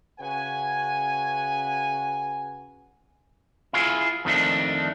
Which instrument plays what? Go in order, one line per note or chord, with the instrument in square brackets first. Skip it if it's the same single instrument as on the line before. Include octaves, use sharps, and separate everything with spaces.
[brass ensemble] C#3 F#4 B4 F#5 G#5
[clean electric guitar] E4 F4 G#4
F2 D#3 A3 D4